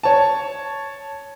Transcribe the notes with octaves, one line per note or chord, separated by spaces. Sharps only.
C#5 A5